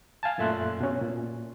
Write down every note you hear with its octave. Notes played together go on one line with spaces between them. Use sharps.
F5 G#5 A5
F#2 A#2 A3 E5 C6 F#6
B2 C#4
A#2